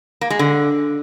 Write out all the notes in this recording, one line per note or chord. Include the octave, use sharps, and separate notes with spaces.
A#3
G#3
D3